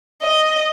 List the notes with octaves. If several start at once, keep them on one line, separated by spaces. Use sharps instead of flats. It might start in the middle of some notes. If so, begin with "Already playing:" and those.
D#5